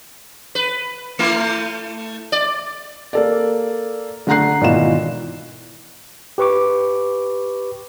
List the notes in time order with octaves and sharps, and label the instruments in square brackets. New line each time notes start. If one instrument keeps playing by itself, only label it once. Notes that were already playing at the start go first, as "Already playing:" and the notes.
[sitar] B4
A3 E4
D5
[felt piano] A#3 A4 D5
D3 A3 F#5 A#5 F#6 C7
G#1 B2 E3 F4 E7
[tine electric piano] G4 B4 C#6 D6